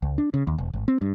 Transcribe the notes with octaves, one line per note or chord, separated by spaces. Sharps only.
C#2
D4
C#3
D#2
E1
G#1
C4
G2